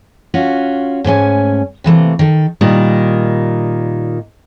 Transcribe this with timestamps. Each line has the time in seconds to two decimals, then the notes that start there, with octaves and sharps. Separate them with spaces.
0.34 C#4 F4 F#4
1.04 G#2 A3 C#4 G#5
1.84 C3 E3 A3 A#3
2.19 D#3 A4
2.61 A#2 D#3 G3